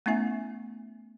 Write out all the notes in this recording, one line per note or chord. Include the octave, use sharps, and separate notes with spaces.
A3 B3 C#4 E4 E5 G#5